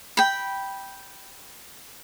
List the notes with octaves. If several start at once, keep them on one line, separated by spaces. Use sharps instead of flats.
G5 B5